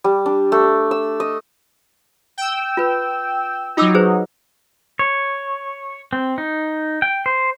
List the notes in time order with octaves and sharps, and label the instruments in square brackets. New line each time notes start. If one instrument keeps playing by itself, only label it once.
[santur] G3
D4
A3
E6
D#5
[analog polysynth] G5 E6
[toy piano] F4 B4
[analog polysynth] F#3 D#4 [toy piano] F4 D6 E6
[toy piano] G#4 B4 C5
[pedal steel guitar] C#5
C4
D#4
G5
C5